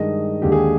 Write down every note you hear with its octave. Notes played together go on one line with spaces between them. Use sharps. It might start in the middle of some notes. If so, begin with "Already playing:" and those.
Already playing: G2 D#3 G#3 D#5
D#2 D3 G#3 G4
G#4